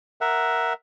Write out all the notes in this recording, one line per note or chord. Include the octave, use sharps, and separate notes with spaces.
A#4 E5 F#5